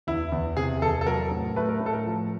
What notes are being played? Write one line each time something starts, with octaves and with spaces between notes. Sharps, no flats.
E2 E4
E2
C3 G#4
E2 A4
A4
F#3 A#4
A2
A3 B4
A#4
A2
A4
A#4
F3